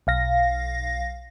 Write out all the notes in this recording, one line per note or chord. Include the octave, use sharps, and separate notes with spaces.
B1 F5 A#6